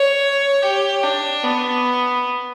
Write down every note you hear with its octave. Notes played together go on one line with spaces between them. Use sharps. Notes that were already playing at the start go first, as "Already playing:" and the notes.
Already playing: C#5
G4
D4
B3